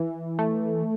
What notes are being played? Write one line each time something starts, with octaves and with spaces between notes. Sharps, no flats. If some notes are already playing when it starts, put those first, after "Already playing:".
Already playing: E3
A3